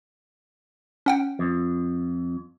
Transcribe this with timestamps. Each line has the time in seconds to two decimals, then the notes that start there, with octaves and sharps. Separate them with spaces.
1.06 C#4 F#5 G5
1.39 F2